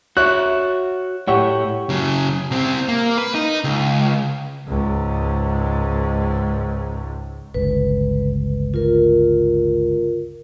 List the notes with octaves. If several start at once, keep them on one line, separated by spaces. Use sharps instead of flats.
F#4 C#5 E5 F#6
A2 G4 C#5 E5 F#5
C#3 F#3
C2 C4
A#3
B4
D#4
C#2
C#2 G#2
G1 C#2 B4
F4 A#4